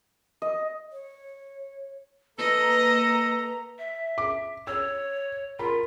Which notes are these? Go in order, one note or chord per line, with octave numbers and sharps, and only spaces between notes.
D#5
C#5
A#3 A4 B4 D#5 A#5
E5
D6
C#5 E6
F4 A#4 B5